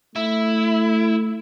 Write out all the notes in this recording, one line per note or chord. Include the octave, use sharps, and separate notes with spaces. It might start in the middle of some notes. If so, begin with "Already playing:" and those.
A3 E4